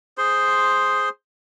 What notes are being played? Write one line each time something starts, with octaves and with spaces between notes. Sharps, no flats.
G#4 C5 C6